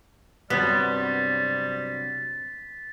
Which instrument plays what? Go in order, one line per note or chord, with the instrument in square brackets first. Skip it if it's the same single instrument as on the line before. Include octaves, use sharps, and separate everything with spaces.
[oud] G2 C3 F#3 [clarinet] G3 [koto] B3 [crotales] A6 B6